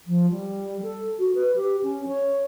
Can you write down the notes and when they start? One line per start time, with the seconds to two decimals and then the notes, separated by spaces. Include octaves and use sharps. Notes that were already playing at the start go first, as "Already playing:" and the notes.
0.07 F3
0.30 G3
0.83 A4
1.19 F#4
1.35 B4
1.56 G4
1.83 C#4
2.07 C#5